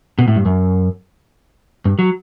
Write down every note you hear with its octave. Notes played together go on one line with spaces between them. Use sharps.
B2
A2
G2
F#2
G2
F#3